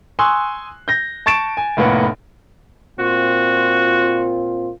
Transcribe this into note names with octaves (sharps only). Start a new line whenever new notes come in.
G#5 C6 C#6 D#6 E6 F#6
G6 A#6
A5 C#6 A6 D7 E7
G#5
F1 A2 A#3 B3 F#5
A#2 C4 F4 F#4